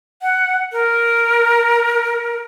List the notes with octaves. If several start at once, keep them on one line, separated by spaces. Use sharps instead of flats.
F#5
A#4